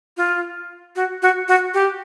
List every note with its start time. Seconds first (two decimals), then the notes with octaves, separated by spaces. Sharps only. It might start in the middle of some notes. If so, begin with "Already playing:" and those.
0.17 F4
0.96 F#4
1.22 F#4
1.48 F#4
1.74 G4